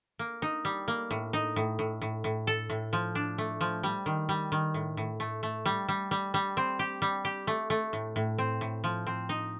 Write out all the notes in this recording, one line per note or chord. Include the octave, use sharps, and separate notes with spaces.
A#3
D#4
G3
A#3
A2
D#4
A2
A2
A2
A2
A4
A2
F3
D4
A3
F3
G3
D#3
G3
D#3
A2
A2
A3
A3
G3
G3
G3
G3
C4
G4
G3
G4
A3
A3
A2
A2
C4
A2
F3
C4
D#4